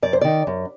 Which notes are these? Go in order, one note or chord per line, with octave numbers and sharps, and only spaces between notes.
F#2 D5
C5
D#3 D5
F#2